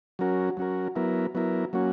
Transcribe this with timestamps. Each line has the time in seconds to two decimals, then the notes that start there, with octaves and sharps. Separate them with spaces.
0.19 F#3 C#4 F#4 A#4
0.57 F#3 C#4 F#4 A#4
0.96 F#3 B3 E4 A#4
1.34 F#3 B3 E4 A#4
1.73 F#3 A#3 C#4 F#4